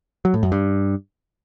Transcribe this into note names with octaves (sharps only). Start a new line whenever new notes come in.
F#3
A2
F#2
G2